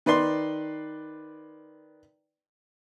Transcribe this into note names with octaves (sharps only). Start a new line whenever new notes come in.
D#3 B4 D5 C6